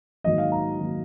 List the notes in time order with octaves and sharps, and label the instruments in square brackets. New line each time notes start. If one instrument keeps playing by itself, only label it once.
[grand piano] G#2 D#3 F#3 A#3 D#5
F5
A#5
D#3 F#3 A#3